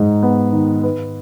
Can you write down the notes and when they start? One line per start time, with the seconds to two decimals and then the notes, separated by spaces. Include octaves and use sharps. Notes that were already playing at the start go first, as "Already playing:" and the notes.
Already playing: G#2 D#4
0.23 B3
0.53 D#3
0.84 B4